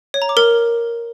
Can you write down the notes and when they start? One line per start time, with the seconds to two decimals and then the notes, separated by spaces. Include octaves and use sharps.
0.14 C#5
0.22 A#5
0.29 D6
0.37 A#4